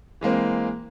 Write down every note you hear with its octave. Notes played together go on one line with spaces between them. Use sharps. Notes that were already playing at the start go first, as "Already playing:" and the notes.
E3 G#3 A#3 C4